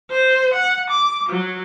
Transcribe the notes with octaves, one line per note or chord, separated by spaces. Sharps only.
C5
F#5
D6
F#3